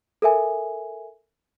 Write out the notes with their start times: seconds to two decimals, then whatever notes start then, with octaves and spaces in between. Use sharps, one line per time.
0.22 A4 A#4 E5 G#5